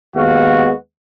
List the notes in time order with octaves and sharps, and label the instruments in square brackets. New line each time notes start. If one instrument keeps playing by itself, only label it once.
[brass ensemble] D#2 G#3 B3 F#4 F5